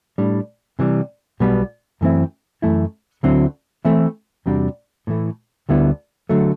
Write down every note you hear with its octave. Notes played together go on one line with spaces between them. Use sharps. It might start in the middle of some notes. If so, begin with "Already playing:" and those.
A2 G3 D4
C3 E3 G3
B1 B2 G3 B3
F#2 E3 A3 C4 E4
F#2 E3 A3 E4
D2 D3 F#3 C4 E4
E3 A3 C4 E4
E2 C3 G3 D4 F#4
A2 E3 A3
D2 D3 G3 B3 E4
D3 F#3 A3